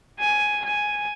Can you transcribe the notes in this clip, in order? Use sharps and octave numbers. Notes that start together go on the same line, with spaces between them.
G#5
G#5